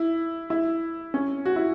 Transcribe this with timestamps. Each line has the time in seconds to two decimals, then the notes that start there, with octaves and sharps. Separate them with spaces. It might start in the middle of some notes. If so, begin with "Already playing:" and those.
Already playing: E4
0.50 E4
1.14 C#4
1.45 F#4
1.56 E4